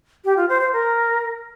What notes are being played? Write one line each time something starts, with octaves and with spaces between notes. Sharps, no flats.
G4
F4
C5
C5
A#4